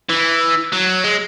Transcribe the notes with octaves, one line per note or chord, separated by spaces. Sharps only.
E3
F#3
G#3